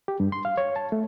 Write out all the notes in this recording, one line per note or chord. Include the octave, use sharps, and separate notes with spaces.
G4
G2
C6
F5
C#5
A5
A3